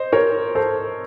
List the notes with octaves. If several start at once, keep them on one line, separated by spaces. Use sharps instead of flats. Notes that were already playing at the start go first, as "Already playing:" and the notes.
Already playing: C5 D#5
A#4 C#5
A4 C5